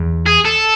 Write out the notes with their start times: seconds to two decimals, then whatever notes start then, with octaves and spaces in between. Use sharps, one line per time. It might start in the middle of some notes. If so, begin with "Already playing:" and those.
Already playing: E2
0.27 G#4
0.45 A4